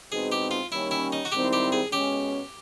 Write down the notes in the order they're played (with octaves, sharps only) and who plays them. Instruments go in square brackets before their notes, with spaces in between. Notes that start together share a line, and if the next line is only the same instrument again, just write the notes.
[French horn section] E2 B2 G#3 C4 D#4 [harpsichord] G#4
[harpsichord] G4
F4
[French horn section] D#3 G3 A#3 C#4 [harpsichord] E4
[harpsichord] E4
D#4
F#4
[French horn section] G#2 D#3 G3 C4 E4 [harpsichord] G4
[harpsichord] G4
G#4
[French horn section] B2 G#3 C#4 [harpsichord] G4